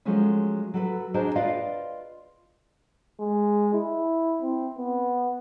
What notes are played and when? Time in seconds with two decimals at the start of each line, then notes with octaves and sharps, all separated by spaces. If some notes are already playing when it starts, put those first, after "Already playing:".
0.05 F3 F#3 G#3 A3 C#4
0.74 F#3 A4 B4
1.14 D4 F#4 G#4 A#4 C5 D#5
1.35 F4 B4 D5 D#5 F5
3.20 G#3
3.74 E4
4.42 C4
4.78 B3